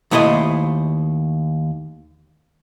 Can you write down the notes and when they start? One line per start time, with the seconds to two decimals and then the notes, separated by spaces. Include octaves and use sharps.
0.11 D#2 A3 E4 C5 D#5